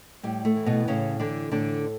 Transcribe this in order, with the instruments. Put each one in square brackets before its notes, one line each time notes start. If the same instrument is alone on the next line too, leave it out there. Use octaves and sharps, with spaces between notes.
[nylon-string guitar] A2 G3
A3
E3
B2 B3
A2 C#3 C#4
D3 E3 D4
A2 D3 D4